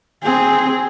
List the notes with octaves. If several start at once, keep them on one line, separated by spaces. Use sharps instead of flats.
C4 G#4